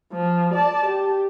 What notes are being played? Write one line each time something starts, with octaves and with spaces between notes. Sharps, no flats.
F3
D5 A5
G4